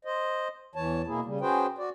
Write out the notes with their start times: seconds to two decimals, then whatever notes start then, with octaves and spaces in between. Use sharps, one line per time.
0.05 C5 D#5
0.75 E2 E3 C#5 A5
1.07 B2 A#3 E4 G#4
1.25 C#3 G3
1.41 C#4 F#4 G#4 B4 C5 G5
1.78 F#4 D5